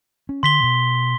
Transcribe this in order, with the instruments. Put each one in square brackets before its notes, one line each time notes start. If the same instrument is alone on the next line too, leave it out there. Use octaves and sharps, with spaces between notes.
[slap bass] C#4
[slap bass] D3 [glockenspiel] C6 B6 G7
[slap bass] B2